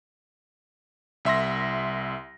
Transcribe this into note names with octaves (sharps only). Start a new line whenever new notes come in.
C2 E5 C6 A#6